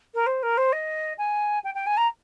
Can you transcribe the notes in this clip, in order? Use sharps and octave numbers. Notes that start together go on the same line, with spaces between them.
A#4
C5
A#4
C5
D#5
G#5
G5
G5
G#5
A#5